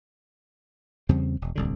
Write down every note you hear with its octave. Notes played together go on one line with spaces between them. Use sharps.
E2 C#3 G3 C4
E1
D1 C2 D3